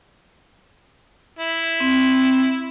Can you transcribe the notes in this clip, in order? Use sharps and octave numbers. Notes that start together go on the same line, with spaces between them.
E4
C4